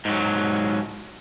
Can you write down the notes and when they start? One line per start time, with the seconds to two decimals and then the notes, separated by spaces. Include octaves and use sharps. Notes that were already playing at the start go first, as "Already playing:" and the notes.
0.05 G#2 F#3